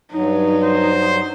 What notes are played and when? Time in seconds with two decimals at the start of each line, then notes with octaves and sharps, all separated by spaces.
0.13 G2 F#3 D#4
0.63 C5